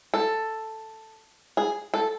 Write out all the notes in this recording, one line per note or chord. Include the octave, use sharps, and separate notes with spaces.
A4
G#4
A4